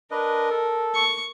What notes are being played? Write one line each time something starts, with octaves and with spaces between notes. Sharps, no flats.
D4 A#4 B4 D#5
A4
C#6